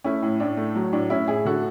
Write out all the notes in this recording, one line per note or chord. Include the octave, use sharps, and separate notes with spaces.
A3 C#4 E4
A2
A2 D4
A3
F#3
A2 D4
A2 C#4 E4
A2 E4 G#4
D3 F#4 A4